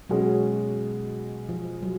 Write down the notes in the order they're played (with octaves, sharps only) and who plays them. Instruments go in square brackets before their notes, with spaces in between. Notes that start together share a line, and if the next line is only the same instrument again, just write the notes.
[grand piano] B2 G#3 C#4 [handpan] F#3
[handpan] F3
F#3